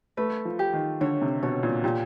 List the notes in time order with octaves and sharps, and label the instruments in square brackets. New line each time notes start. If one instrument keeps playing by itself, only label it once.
[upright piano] A3 [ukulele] B4
[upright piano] F3
[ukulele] G4
[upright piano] D#3
[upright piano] D3 [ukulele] C#5
[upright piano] C3
[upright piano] B2 [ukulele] C#5
[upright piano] A#2
[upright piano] A#2 [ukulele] G4